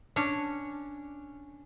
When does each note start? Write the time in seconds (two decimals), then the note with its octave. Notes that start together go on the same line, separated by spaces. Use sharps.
0.16 C#4 D4 C#5